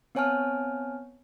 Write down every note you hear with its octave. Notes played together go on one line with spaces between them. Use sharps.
B3 C4 C#5 G#5 A5 F6